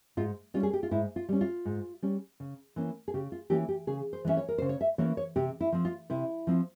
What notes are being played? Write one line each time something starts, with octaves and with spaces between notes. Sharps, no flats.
G#2 F4
G3 C#4 F4
G#4
G4
F4
G#2 E4
F4
G3 C#4
F4
G#2
G3 C#4
C#3
E3 A#3 C#4
G#4
C#3 G4
F4
E3 A#3 C#4 G4
G4
C#3 G#4
C5
E3 A#3 C#4 E5
C#5
A#4
C#3 C5
C#5
E5
E3 A#3 C#4 C#5
C#5
C3 G4
E4
F3 C4
F4
C3 E4
F3 C4